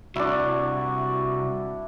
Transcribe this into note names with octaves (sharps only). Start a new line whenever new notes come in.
C2 D4 E4 F#4